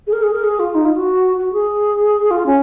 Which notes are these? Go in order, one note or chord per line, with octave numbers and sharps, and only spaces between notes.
G#4
A#4
G#4
A#4
G#4
F4
D#4
F4
F#4
F#4
G#4
F4
C#4